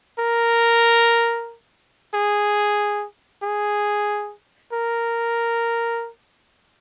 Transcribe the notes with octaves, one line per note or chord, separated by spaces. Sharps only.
A#4
G#4
G#4
A#4